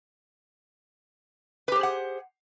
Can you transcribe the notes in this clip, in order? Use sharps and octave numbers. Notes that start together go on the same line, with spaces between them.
G4 G#4 B4 C5 F#5